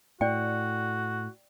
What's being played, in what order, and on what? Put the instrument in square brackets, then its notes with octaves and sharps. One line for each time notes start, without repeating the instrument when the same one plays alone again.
[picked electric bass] A2 [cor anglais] F#4 [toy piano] D5 G5